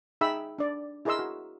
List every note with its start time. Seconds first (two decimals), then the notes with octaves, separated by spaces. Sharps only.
0.21 D#4 G#4 E5 G5 B5 E6
0.59 D4 D5
1.05 E4 G#4 A#4 D#5 C6 E6
1.19 F#4